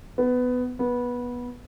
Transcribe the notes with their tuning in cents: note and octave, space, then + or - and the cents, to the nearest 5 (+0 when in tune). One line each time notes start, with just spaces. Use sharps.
B3 +15
B3 -15